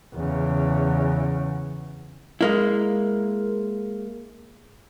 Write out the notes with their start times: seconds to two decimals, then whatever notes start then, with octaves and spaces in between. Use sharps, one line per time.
0.15 E2 C#3
2.41 G#3 A#3 E4